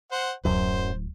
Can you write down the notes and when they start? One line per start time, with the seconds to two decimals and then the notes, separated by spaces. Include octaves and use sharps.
0.12 C5 F#5
0.45 D1 F#2 C5